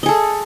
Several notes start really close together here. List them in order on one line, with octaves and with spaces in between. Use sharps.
D#5 G#4 A4